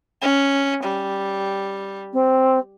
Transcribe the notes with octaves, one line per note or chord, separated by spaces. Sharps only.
C#4
G3
C4